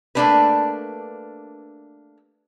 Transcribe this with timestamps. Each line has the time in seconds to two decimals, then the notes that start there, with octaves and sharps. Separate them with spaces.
0.15 A3 A#3 C4 D4 G4 B4